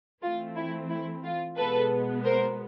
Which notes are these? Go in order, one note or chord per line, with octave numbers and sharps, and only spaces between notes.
E3 A3 C4 F4
E4
E4
F4
B2 G#3 B3 A4 B4
A#4 C5